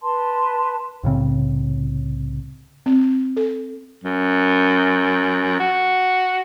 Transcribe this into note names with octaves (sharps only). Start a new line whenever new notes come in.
B4 A5 C6
C2 A2 C#3 C4
C4
A4
F#2
F#4